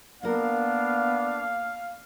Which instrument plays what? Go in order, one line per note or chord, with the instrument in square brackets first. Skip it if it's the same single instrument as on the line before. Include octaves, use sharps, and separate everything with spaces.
[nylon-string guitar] A#3 A#4 [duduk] B3 [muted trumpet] D4 [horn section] F5